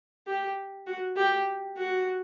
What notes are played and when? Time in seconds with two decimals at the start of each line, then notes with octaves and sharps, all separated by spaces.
0.27 G4
0.86 F#4
1.16 G4
1.77 F#4